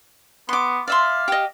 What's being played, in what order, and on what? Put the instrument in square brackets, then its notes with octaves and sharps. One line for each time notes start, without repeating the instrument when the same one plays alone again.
[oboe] B3 [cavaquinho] C6 D6
[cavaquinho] D5 E5 C6 [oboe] F5
[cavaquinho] G4 D#5